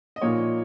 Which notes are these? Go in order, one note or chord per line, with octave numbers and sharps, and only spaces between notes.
D#5
A#2 F3 A#3 D#4 C#5